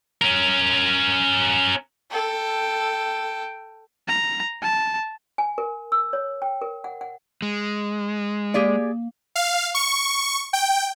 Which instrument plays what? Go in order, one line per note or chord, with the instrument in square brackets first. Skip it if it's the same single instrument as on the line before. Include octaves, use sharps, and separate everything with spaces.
[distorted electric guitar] C#4 A#4
[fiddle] A4 G5
[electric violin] A#5
A5
[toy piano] G#5
A#4
E6
C#5
G5
A#4
F#5
F#5
[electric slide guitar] G#3
[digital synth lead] A#3 [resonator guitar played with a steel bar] G4 G#4 D5
[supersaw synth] F5
C#6
G5